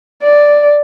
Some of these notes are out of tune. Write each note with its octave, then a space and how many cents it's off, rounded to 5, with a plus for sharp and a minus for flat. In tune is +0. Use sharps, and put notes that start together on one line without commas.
D5 +0